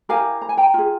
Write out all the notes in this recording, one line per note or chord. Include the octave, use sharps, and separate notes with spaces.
E4 G4 A#4 F5 G#5
A#5
G#5
G5 A#5
F4 G#4